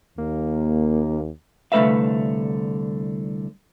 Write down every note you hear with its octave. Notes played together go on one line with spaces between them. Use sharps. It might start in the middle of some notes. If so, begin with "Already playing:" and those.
D#2 A#3
C2 D3 A3 B4 E5 F5